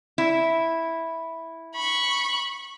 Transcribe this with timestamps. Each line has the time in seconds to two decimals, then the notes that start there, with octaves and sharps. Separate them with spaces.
0.18 E4
1.75 B5 C#6